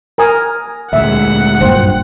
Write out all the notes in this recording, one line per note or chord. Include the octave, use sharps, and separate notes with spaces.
A#4 G#5 D#6
D2 A#2 G#3 E5 F#5
F#1 G2 A#2 C5 G5